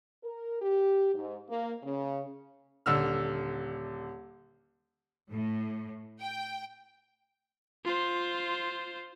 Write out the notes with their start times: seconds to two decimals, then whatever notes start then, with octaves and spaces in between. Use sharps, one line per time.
0.24 A#4
0.62 G4
1.15 G#2
1.49 A#3
1.83 C#3
2.86 D#1 D3 E6 F6
5.31 A2
6.19 G5
7.85 F4 C5